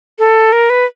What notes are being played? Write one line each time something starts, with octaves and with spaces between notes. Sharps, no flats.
A4
A#4
B4